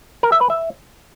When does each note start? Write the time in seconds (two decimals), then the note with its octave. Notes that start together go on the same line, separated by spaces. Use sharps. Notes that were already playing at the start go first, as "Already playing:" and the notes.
0.23 A#4
0.32 E5
0.41 B4
0.50 E5